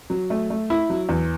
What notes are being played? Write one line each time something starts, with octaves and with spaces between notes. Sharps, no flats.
F#3
A3
A3
E4
F#3
E2